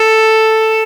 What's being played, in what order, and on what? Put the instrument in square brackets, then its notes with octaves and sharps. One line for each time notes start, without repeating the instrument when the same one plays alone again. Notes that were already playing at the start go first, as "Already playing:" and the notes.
Already playing: [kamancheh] A4